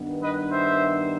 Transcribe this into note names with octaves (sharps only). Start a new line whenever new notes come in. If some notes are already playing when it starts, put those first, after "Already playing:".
Already playing: G2 D#3 G3 B3
B4 D#5
C5 E5